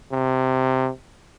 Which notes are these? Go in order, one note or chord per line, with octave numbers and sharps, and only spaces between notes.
C3